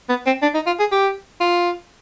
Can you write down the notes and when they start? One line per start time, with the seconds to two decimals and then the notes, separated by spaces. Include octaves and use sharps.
0.09 B3
0.26 C4
0.42 D4
0.54 D#4
0.66 F4
0.79 G#4
0.92 G4
1.40 F4